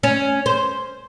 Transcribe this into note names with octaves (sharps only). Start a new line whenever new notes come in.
C#4
C5